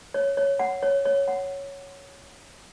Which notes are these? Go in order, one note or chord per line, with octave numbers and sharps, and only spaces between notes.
C#5
C#5
F#5
C#5
C#5
F#5